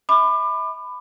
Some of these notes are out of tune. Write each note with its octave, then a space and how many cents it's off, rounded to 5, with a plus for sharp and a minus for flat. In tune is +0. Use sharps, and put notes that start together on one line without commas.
E5 -30 B5 +15 D6 +35